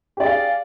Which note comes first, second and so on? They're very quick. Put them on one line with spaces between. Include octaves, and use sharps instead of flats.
G4 D5 G#4 F5